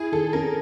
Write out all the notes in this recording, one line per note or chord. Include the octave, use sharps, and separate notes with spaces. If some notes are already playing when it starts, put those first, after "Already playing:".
Already playing: E4 G#4
D#3 A4
C#4 A#4